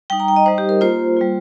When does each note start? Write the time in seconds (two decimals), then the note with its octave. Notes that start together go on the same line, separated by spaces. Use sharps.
0.10 G3 D#4 G5
0.20 A#5
0.28 G5
0.36 D#5
0.46 G3 D#4 C5
0.58 G4
0.69 A#4
0.81 A#3 F4 C5
1.17 G3 A#3 F4